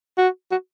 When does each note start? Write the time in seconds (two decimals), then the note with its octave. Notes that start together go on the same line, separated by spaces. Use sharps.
0.18 F#4
0.51 F#4